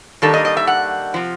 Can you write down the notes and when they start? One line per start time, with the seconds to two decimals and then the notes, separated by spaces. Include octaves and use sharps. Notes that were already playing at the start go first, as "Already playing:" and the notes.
0.22 D#3 G3 A#3 D4 A4
0.34 D#5
0.45 D#5
0.57 E5
0.67 F#5
1.14 C3 F3